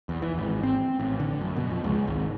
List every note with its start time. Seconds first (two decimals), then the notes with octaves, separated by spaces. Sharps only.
0.09 E2
0.22 E3
0.38 G#1
0.63 C4
1.00 A1
1.20 D3
1.41 F#2
1.57 B2
1.71 F2
1.84 C#2
2.07 G#1